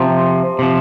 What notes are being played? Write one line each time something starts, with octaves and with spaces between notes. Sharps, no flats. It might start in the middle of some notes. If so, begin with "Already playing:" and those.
Already playing: C3 F3
C3 F3